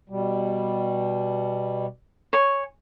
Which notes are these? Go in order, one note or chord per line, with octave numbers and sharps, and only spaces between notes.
B2 G3
C#5 G#5 C#6